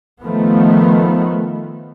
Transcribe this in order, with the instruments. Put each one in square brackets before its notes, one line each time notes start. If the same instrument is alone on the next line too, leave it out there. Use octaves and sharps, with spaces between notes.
[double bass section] D#3 F3 A3 B3